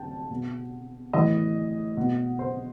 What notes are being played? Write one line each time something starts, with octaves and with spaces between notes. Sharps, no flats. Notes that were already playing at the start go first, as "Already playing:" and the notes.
Already playing: G5 A5
B2
A2 E3 D#5
B2
C5